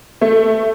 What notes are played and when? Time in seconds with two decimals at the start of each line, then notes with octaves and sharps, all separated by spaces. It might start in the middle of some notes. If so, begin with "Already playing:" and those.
0.21 A3